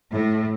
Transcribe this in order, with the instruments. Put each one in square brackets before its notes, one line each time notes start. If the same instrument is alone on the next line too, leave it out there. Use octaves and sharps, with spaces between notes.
[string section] A2